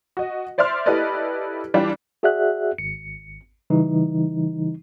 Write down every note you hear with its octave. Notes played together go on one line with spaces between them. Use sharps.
F#4 D#5
C5 D5 E5 C6 F6
E4 G4 A4 B4 D5 D#5
E3 G3 D4 F4
F#4 G#4 D5 E5 F#5 F#6
G#1 C#7
C#3 E3 G3 D#4